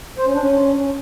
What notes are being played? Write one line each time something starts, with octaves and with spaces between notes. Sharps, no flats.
C5
C#4
D4
C#4